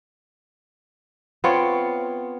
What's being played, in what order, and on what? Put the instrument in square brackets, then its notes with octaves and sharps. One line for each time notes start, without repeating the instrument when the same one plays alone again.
[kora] B3 C4 F4 C#5